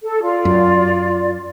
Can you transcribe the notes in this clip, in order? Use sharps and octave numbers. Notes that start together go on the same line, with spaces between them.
A4
F4 D5
F#2